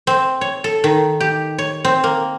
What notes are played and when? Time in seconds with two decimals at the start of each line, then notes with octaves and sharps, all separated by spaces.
0.07 C4
0.41 C#5
0.64 A4
0.84 D#3
1.20 G4
1.58 C#5
1.85 C4
2.04 A#3